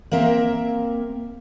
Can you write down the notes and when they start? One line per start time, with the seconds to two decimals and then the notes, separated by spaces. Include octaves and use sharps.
0.12 A#3 C4 A#4 E5